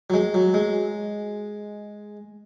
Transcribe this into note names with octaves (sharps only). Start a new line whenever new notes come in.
F#3
G#3
F#3
G#3